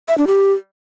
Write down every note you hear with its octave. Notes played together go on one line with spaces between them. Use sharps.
E5
D4
G4